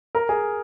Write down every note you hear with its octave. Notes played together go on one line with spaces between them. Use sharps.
A#4
G#4